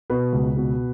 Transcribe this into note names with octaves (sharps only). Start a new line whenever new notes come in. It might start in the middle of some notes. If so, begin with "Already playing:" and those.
B2 B4
C#2
B2